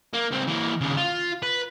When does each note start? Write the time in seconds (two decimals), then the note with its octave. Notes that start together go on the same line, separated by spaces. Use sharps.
0.14 A#3
0.31 C#2 C4
0.48 E3 A#3
0.81 D#2 C#3
0.97 F4
1.43 B4